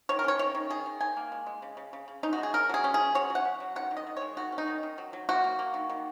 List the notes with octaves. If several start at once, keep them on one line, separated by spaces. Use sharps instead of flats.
D#3 C#5
A#4
C#4 C#5
D#3 C#5
D#3
D#3 G#4
D#3
D#3 G#5
A#3
G#3
G#3
C#3
C#3
C#3
C#3
C#4 D#4
F#4
G#3
G#4
C#4 A#4
F#3 G#4
C#4
G#4
C#4
F#3 C#5
F#3
F#5
C#4
F#3
D#3 F#5
D#3
D#5
D#3
G#3 C#5
D#3 F#4
C#4
D#4
D#3
D#3
F#3
F#3
A#3 F#4
A#3
A#3
D#3
D#3